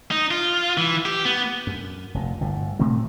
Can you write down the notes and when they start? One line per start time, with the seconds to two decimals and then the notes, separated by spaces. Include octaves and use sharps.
0.11 D#4
0.31 F4
0.77 E3
1.05 G4
1.25 B3
1.67 F#2
2.14 F1 A#2
2.40 G1 A2
2.79 A2 C3 A3 C4